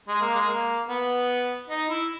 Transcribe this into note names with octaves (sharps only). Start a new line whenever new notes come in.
G#3
A#3
G#3
A#3
B3
D#4
E4